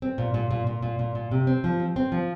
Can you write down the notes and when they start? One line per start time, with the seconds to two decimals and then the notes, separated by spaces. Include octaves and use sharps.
0.02 C4
0.18 A#2
0.34 A#2
0.51 A#2
0.67 A#2
0.82 A#2
0.99 A#2
1.15 A#2
1.31 C3
1.47 C4
1.64 F3
1.80 C4
1.96 C4
2.12 F3